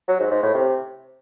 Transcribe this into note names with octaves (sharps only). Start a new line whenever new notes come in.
F#3
G#2
G#2
A2
C3